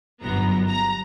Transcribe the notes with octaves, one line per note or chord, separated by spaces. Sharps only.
G1 F#2 B3 A#5
A#5